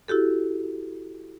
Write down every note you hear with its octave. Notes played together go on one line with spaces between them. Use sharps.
E4 F#4 G4 A4